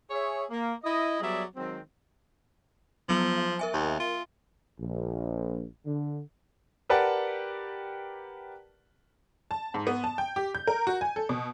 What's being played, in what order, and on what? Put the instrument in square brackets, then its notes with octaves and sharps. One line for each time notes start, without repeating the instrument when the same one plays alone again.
[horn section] G#4 C#5 E5
A#3
E4 D#5
F#3 G3 B3 G#4 D5 E5
D#3 F#3 G#3 C4
[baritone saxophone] F3 [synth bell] F#3 B3 F#7
[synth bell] A#4 E5 G#5
[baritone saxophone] D#2
F4
[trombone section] A#1
D3
[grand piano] G4 A#4 B4 D5 F#5 A5
[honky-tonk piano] A5
G#2
B3
A5
G5
G4
G6
A#4
F#4
G#5
A4
B2